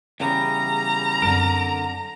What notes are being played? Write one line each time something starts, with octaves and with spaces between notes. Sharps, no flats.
E2 C#3 G3 A#5
F#2 D3 C4 A#4